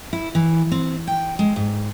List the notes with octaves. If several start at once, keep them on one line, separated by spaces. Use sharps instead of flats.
E4
E3
C4
G5
G#3
G#2